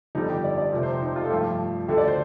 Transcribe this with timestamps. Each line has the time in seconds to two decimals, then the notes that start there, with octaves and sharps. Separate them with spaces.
0.15 G1 F2 D3 G3 D#4
0.30 G4
0.44 D5
0.58 D5
0.72 F1 F2 C3
0.83 C5
0.92 G4
1.02 D#4
1.16 F4
1.24 A4
1.30 G2 F3 A3 G4
1.88 D2 D3 A3 G4
1.98 D5
2.08 C5